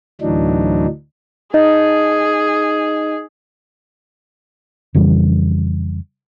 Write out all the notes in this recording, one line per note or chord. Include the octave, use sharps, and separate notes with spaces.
D2 A2 E3 F#3 D4 D#4
D#4 G#4 D#5
F2 C#3 E3 G3